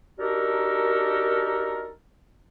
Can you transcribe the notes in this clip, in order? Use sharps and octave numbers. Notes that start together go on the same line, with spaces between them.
D4 D#4 F#4 G4 A4 A#4